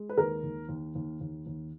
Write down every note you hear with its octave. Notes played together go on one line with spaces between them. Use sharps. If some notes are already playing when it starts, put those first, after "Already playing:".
Already playing: G#3
B4
D#2 A#4
D#2
D#2
D#2
D#2
D#2